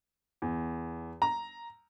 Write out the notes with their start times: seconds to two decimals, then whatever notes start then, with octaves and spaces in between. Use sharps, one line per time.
0.42 E2
1.22 A#5